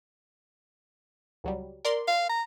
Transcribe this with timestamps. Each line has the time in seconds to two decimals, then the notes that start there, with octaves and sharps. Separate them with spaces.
1.44 C#2 F#3 G3
1.85 A#4 D5 C6
2.08 F5
2.29 A#5